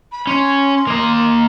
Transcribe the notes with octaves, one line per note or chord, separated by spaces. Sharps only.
B5
C#4 C6
A#3 D#5